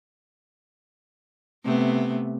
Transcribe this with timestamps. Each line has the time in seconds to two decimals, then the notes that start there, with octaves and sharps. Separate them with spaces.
1.64 C3 A3 B3